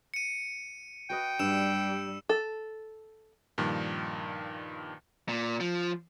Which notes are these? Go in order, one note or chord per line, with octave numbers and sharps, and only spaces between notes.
C#7 D#7
F#4 B4 D#5 G5
G2 G3 F#5 E6 E7
A4
G2 A#2 D#3 F3 D4
A#2
F3